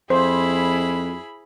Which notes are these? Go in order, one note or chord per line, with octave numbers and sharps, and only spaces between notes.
F2 E4 G#4 C5 B5